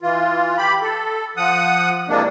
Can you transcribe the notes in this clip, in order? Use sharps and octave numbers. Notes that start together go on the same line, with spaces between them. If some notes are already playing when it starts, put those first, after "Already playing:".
E3 F4
G4 B5
A4
F3 F#5 D#6
C3 E3 G#3 A#3 D4